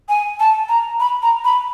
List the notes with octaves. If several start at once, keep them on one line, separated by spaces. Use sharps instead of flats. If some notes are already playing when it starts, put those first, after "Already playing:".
G#5
A5
A#5
B5
A#5
B5